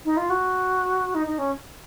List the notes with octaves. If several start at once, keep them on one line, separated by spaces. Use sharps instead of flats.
D#4
F4
F#4
D#4
D#4
C#4